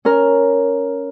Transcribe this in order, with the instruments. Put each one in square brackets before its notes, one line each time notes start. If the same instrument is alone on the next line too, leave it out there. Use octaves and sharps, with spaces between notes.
[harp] C#4 A#4